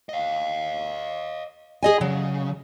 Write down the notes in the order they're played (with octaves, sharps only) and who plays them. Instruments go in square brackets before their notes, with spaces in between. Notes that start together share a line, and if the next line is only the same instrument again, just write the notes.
[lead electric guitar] D#5 F5
[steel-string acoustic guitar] G#4 D#5 G#5
[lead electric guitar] C#3 [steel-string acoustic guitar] F#3